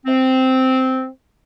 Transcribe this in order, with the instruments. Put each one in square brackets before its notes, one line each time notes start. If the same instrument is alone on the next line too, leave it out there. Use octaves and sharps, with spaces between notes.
[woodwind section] C4